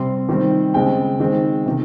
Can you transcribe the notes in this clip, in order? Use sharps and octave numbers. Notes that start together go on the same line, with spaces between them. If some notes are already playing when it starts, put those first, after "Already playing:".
Already playing: C3 G3 C4 C6
D#3 G3 C4
C#3 G#3 C4 G5
D#3 G#3 C4
C3 D#3